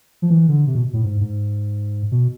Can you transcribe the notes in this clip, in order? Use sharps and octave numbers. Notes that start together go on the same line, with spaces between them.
F3
E3
D3
C3
B2
A2
G#2
G#2
B2